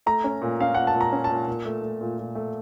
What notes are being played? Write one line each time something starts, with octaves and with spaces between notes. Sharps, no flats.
A3 A#5
C#4
A#2
C#4 F5
A#2 F#5
A5
A#2
A#5
C#4
A5
A#2
A#2
A3
A3
A#2
A#2
A3